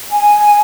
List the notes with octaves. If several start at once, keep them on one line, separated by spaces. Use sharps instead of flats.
G#5